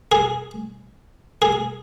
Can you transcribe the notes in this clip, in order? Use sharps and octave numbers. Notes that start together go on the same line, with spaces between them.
G#4
G#4